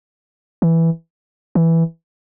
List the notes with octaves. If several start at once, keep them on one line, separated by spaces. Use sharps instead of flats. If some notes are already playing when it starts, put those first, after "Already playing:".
E3
E3